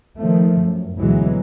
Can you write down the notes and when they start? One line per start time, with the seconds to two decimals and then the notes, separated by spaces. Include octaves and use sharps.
0.17 D#3 F3 A3
0.62 F#2
0.98 D2 B2 E3 F#3 G#3